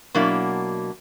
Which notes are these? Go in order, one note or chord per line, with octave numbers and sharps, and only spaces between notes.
B2 F#3 A#3 D4 E4